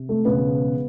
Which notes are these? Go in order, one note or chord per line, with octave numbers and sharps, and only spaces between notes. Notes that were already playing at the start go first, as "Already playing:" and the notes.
Already playing: C3
A3 A4
E1 E2 C#3 B3 B4